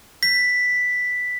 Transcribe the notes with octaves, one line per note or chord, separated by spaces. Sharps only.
B6